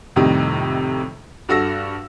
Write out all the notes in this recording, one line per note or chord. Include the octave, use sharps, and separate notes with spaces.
F2 A2 C3 D#3 G3 D#4
G2 F#4 A4 E6 A#6